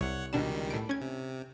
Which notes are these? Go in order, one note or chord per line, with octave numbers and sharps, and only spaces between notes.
C2 C#5 F#5
C#2 B2 D#3 G3 D4 E7
A2 D7
C#4 G#6
C3